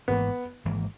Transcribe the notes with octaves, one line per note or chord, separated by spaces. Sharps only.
G#1 G#2 E3 A#3 B3
G#1 G#2 E3 A#3